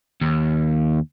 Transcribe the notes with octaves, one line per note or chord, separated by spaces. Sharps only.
D#2